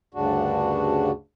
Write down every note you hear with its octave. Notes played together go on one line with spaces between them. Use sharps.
D2 G2 C#3 D4 F#4